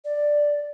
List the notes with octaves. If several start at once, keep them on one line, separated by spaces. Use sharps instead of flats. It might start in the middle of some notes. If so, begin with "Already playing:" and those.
D5